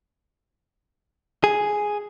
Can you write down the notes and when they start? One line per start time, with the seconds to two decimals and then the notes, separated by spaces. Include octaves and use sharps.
1.44 G#4